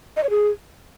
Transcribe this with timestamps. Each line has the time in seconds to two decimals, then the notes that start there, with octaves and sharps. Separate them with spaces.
0.17 D#5
0.23 C#5
0.30 G#4